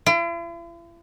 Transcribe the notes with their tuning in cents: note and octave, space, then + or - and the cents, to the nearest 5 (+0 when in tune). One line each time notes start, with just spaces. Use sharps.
E4 +45